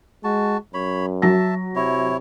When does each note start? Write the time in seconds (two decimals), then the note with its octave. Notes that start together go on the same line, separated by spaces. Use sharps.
0.24 G#3 F#4 A5
0.74 F#2 C#5 B5
1.22 F#3 E5 A5 A#6
1.76 C3 E4 C#5